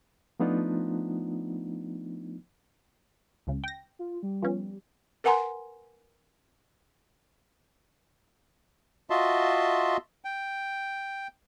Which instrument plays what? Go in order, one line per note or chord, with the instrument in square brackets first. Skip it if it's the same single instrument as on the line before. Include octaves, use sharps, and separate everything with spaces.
[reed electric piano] F3 A3 B3 D4 D#4 F4
[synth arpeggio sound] C#2 C#3
G5 A#6
[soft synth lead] F4
G3
[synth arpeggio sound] F3 B3 C#4
[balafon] A#4 B4 F#5 G#5 A#5 C6
[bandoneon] F4 F#4 D#5 E5 A5 C6
G5